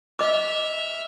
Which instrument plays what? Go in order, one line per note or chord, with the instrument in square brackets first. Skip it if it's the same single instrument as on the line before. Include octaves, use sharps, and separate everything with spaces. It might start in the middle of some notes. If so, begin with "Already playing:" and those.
[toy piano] D#5 D6 [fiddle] E5 F6